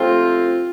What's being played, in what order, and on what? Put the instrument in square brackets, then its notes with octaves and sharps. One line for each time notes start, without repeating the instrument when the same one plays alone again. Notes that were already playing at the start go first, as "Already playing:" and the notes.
Already playing: [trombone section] C3 F3 A3 C4 [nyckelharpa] F4